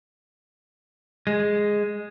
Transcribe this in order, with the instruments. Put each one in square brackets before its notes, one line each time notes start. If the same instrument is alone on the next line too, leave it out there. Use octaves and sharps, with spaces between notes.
[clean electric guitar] G#3